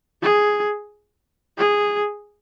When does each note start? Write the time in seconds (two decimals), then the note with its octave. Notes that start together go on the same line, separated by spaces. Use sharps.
0.23 G#4
1.58 G#4